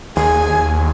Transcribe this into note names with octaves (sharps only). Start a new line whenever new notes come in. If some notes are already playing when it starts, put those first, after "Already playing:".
D#2 G#4 G#5